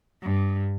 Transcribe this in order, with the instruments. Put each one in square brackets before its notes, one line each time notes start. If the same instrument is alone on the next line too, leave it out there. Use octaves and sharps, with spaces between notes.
[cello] G2